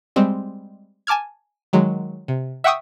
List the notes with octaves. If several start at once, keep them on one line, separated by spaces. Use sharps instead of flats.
G3 G#3 C4
G#5 A5 D6 F6 G#6
D#3 F#3 G#3
C3
E5 F#5 G5 C#6 D#6 E6